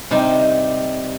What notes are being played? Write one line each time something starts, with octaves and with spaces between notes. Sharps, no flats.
C3 G3 D#4